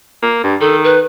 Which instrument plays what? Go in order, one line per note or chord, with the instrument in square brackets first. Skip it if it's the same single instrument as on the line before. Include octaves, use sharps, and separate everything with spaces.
[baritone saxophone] A#3
G2
[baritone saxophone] D#3 [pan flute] A4
[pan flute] B4